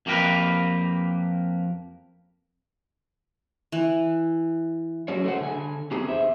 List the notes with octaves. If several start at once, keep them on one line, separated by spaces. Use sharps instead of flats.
F2 A#3 G4 A#4 B4
E3
F#3 C#4 G#4 C#5
A3 G#4 B4 C5 F#5
D3 G#5
B3 C4 D#4 G4 G#4
E2 C5 E5